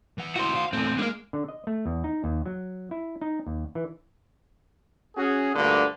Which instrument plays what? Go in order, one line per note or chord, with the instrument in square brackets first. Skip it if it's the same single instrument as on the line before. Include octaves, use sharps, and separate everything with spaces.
[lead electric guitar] E3 F#5
[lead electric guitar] C3 E4 [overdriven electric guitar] F#4 C5
[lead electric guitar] F5
[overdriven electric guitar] E2 C4 [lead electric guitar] A#2 A3
[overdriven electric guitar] D3 A#3 [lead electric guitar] G#3
[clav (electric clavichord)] D3
D#5
A3
E2
D#4
D#2
F#3
E4
D#4
D#2
E3
[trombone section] C#4 F#4 G#4
D2 G2 A#2 D3